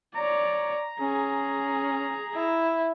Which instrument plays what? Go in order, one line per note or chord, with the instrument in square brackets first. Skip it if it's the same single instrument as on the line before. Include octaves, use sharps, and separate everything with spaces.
[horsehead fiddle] C#5 D5 [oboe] A#5
[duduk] C#4 [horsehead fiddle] G#4
[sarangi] E4